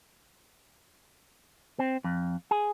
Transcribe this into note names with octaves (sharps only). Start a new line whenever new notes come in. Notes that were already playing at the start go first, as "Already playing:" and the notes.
C4
F2
G#4